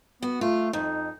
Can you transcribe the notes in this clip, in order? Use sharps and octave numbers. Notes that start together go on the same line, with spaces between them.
B3 F#4
A3 F4
F2 D#4